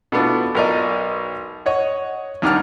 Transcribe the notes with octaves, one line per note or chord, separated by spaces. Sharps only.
B2 A3 B3 D4 E4 F4
B1 F4 A#4 D5 D#5
C#5 D#5 F#5
D#2 D#3 G3 D4 F#5 F6